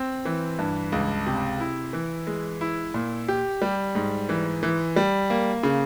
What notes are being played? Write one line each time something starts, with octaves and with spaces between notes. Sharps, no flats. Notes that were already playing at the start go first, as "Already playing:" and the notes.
Already playing: C4
E3
G2
C#2
C3
E4
E3
G#3
E4
A#2
G4
G3
G#2
E3
E3
G3
A#3
C#3